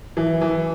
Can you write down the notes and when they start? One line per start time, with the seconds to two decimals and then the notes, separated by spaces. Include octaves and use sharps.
0.17 E3
0.41 E3